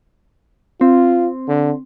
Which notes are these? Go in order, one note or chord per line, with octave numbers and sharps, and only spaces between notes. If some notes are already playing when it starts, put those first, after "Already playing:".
C4 F4
D3